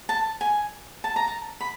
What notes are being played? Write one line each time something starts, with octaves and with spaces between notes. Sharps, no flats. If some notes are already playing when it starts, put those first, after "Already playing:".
A5
G#5
A5
A#5
A5
B5